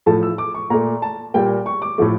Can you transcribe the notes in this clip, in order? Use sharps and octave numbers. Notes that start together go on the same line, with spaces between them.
A2 F3 A3 A5
E6
D6
C#6
A#2 A3 A#5
A5
A#2 G3 A#3 G5
C#6
D6
A2 F3 A3